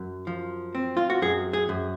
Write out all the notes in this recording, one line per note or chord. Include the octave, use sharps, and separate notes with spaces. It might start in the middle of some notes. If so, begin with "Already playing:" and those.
Already playing: F#2
F3
C4
F4
F#4
F#2 G#4
G#4
F#2